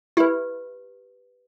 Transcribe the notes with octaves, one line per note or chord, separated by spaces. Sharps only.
E4 G4 B4